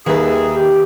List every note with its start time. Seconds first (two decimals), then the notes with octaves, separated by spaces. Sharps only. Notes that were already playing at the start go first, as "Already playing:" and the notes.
0.06 D#2 D#3 G#4 B4 E5
0.53 G4